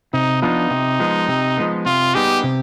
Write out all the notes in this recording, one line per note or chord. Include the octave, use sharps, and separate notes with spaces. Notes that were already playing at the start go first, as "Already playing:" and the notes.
C3 D#4
F3 B3 D4 D#4 F4
C3
F3 G#3 B3
C3
F3 G#3 B3
C3 F4
G3 B3 D#4 G4 G#4
C3